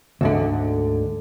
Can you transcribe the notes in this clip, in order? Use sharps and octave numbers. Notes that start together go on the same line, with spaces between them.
D2 G#2 D3